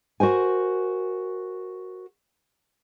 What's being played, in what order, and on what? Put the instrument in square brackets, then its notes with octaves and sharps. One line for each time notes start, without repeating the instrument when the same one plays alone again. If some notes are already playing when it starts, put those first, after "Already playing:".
[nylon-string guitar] F#4 A#4 C5 G#5